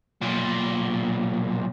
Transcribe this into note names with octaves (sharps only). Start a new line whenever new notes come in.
B1 A#2